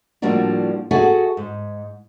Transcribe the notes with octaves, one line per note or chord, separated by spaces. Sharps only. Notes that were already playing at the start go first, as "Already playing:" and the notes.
A2 F3 G3 A#3 D4 F#4
F#4 G#4 A4 E5 F#5 G#5
G#2